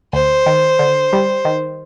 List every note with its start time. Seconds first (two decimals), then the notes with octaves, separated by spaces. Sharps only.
0.13 D2 C5
0.46 D#3
0.79 D3
1.13 G3
1.45 D#3